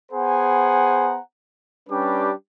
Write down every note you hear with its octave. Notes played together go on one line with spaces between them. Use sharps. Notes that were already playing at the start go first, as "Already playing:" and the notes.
B3 G#4 C5 F#5 G#5 A#5
G3 C#4 D4 G4 B4 D6